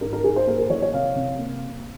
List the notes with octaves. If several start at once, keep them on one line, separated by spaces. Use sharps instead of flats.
G#2 A#4
A#4
G#2 G#4
C5
A#3 A#4
A#4
E3 C#5
C#5
C3 F5
C3
A#3